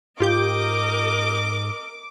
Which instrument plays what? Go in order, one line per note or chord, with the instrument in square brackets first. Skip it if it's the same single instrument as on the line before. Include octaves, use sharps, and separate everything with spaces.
[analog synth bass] G#2 [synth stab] F4 G4 G6 [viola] A#4 D#5 [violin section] D6